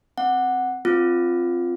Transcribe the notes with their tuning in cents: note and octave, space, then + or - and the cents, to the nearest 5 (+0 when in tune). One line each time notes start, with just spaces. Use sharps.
C4 +0 F#5 +0
C4 +0 F4 +0